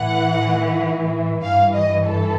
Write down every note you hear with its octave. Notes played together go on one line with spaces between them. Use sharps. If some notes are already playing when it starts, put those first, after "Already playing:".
Already playing: A2 E3 F#5
G2 E3 F5
D#5
A4